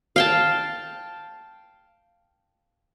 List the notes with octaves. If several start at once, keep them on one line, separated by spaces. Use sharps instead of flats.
F5 G5 A5